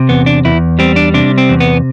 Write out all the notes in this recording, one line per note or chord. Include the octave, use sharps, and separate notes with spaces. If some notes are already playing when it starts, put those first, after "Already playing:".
Already playing: C3
E2 B3
D4
E2 E4
G3 C4
D4
C3 D4
C4
E2
B3